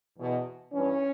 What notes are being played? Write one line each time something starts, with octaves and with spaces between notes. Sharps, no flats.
E2 B2
G2 E3 C#4